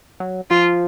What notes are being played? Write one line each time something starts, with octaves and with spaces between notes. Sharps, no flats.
F#3
F3 F4